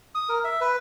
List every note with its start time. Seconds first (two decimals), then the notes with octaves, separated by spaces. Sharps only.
0.15 D#6
0.29 A#4
0.44 E5
0.61 B4